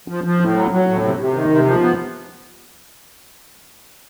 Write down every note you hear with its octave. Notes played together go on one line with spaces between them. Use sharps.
F3
F3
A2
F#3
F#3
A2
C3
C3
D#3
C3
F3
B3